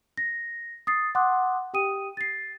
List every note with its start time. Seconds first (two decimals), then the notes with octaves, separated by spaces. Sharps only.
0.17 A#6
0.87 D#6 A6 C7
1.15 F#5 C6 D6 D#6 F#6
1.74 G4 G5 D#6 D#7
2.17 A6 C7